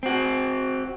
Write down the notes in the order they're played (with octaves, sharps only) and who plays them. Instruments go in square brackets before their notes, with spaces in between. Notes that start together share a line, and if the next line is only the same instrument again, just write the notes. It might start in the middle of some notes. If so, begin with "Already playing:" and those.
[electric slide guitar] C4 F#4